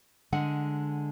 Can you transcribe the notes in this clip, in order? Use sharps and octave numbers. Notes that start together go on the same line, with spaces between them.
D3 G#3 F#5